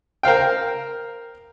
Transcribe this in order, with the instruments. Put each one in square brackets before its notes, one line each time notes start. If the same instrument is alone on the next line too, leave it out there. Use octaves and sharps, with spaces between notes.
[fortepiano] A#4 C5 F5 G5